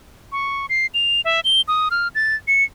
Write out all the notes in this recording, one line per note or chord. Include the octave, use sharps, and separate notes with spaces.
C#6
C7
F7
E5
G7
D#6
F6
A6
C#7